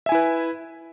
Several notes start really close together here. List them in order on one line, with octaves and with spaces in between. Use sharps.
E5 G#5 E4 B4